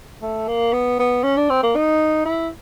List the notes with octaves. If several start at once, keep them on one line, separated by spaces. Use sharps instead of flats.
A3
A#3
B3
B3
C#4
D4
C4
A#3
D#4
E4